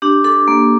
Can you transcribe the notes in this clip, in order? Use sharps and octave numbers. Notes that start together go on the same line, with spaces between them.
D4 G4
D4 A4
A#3